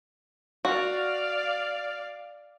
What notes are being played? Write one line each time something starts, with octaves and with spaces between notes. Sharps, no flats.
F#4 D5 F5